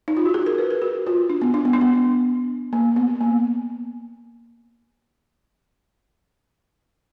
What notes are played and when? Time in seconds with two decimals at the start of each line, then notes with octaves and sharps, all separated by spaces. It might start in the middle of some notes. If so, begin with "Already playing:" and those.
0.08 D#4
0.17 F4
0.25 F#4
0.34 G#4
0.46 A#4
0.58 B4
0.70 A#4
0.82 F#4
1.07 F4
1.30 D4
1.42 B3
1.54 D4
1.65 B3
1.73 D4
1.81 B3
2.73 A#3
2.96 B3
3.21 A#3